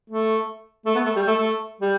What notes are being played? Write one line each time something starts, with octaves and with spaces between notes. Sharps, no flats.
A3
A3
B3
A3
G3
A3
A3
G3